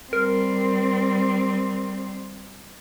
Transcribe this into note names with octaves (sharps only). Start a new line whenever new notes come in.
G3 C4 A#4